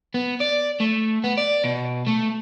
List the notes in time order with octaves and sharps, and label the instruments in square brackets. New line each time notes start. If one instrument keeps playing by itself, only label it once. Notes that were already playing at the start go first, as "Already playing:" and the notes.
[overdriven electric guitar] B3
D5
A3
B3
D5
B2
A3